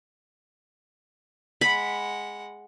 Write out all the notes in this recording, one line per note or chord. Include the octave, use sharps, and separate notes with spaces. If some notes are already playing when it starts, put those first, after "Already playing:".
G#3 F#5 B5